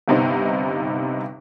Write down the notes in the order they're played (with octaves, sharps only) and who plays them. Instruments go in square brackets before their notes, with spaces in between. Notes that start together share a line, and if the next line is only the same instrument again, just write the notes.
[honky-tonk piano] G1 G2 C3 B3 D#4 C5